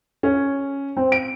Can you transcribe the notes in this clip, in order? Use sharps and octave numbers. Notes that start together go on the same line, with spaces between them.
C#4
C4
D7